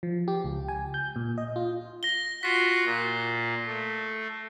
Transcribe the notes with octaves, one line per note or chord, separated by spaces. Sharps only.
F3
G4
C#2
G#5
G6
A#2
D#5
F4
A#6 G7
F4 F#4 B6 C7
A#2
A3